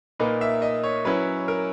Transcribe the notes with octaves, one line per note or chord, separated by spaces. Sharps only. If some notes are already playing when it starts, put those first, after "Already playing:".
A#2 A#3 D#4 B4
E5
D#5
C#5
F#3 C#4 E4 B4
A#4